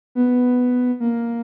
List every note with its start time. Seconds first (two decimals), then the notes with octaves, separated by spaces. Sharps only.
0.15 B3
1.00 A#3